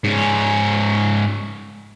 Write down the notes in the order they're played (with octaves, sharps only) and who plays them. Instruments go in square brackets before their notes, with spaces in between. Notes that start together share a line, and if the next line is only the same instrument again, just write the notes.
[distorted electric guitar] G#2 C#4